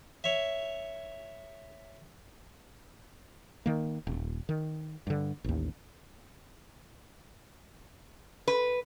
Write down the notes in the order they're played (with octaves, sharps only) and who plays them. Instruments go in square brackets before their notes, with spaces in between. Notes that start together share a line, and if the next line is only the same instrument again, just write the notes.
[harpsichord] C#5 E5
[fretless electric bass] D#3 A#3
D#1
D#3
G2 D3
A1 D#2
[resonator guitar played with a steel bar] B4